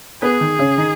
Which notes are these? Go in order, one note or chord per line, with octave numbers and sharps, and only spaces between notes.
B3 G#4 B4
D#3 D#4
C#3 C#4
D#3 D#4